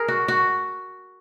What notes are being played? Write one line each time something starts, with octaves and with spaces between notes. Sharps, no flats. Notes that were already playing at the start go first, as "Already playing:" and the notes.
Already playing: G#4 A#4
F#4
F#4